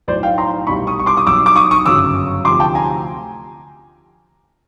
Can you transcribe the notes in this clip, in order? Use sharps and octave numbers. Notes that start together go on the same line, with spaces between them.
B1 A2 F#3 C5 D5
F5 G5
A#5 C6
C2 B2 G3 B5 C#6
C#6 D#6
C#6
C6 D6
C#6 D#6
B1 B2 F#3 D6 E6
D6
C#6 D#6
C#6 D#6
G1 F#2 C#3 F#3 D6 E6
D2 C3 F3 C6 D6
G5 A5
G#5 A#5